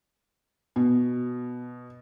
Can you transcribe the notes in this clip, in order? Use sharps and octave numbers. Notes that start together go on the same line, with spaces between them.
B2